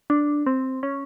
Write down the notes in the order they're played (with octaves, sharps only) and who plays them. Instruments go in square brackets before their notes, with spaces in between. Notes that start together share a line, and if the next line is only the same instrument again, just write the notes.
[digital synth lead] D4
C4
C#4